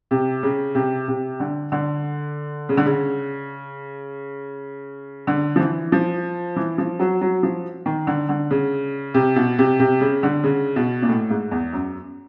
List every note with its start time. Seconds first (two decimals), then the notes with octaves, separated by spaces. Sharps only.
0.11 C3
0.43 C#3
0.75 C3
1.08 C3
1.40 D3
1.72 D3
2.69 C#3
2.77 D3
2.86 C#3
5.27 D3
5.56 F3
5.59 E3
5.92 F3
6.56 E3
6.78 F3
6.99 F#3
7.21 F#3
7.43 F3
7.86 D#3
8.07 D3
8.29 D3
8.50 C#3
9.14 C3
9.36 B2
9.58 C3
9.79 C3
10.01 C#3
10.23 D3
10.43 C#3
10.76 B2
11.02 A#2
11.09 A2
11.30 G#2
11.51 E2
11.73 F#2